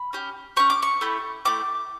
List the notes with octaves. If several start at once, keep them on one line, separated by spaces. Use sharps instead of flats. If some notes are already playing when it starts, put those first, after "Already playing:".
Already playing: B5
C#4 G4
C#4 G4 C#6
D6
C#6
A3 E4 G4
A3 E4 G4 D6